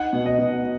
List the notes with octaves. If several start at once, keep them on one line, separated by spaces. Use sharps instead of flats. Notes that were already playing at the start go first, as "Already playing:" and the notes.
Already playing: D#4 F#5
B2
D#5
B2